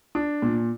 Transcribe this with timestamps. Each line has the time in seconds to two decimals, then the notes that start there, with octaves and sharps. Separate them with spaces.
0.15 D4
0.42 A#2